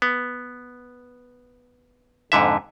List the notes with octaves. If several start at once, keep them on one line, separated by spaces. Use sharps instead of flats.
B3
F2 G#2 D3 E5